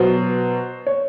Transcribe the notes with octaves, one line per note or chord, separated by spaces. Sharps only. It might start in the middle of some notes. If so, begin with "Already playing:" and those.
Already playing: B2 F#3 C5
C#5